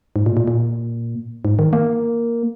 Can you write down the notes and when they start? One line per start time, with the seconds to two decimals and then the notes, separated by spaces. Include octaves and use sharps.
0.16 G#2
0.26 A#2
0.37 A#2
0.48 A#2
1.45 G#2
1.59 D#3
1.73 A#3